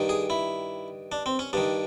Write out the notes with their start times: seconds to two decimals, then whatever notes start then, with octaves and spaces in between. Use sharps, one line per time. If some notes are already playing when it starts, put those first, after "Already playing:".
Already playing: G2 D#3
0.09 G#4
0.30 E4
1.12 D4
1.26 C4
1.39 C#4
1.53 G2 D#3 D4